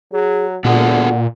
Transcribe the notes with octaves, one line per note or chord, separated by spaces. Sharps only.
F#3 G#4
A#2 D3 B3 F#4 G#4 F#5